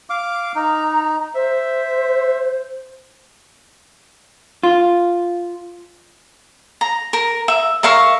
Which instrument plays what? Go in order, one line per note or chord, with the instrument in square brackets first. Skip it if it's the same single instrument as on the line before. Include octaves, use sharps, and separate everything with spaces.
[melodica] F5 D6
[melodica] D#4 [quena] A#5
[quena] C5 [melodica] E5
[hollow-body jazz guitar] F4
[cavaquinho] A#5
A#4
E5
A#4 E5 F5 C#6